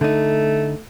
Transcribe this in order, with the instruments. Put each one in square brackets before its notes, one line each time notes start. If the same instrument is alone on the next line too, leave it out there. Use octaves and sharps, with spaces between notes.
[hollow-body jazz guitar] D3 D#4 [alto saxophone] A3